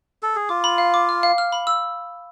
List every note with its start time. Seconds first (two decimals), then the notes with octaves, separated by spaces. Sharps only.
0.23 A4
0.35 G#4
0.49 F4 D6
0.64 B5
0.78 F5
0.94 D6
1.09 F6
1.23 F5
1.38 F6
1.52 B5
1.67 E6